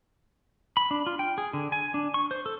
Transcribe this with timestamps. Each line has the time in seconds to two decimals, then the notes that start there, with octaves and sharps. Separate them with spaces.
0.77 B5
0.91 D4
1.06 F4
1.19 G5
1.38 G#4
1.53 D3
1.72 G#5
1.94 D4
2.14 C#6
2.31 C5
2.46 A4